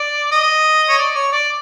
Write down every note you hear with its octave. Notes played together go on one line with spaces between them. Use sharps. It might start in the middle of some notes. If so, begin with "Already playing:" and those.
Already playing: D5
D#5
C#5
D5
C#5
D5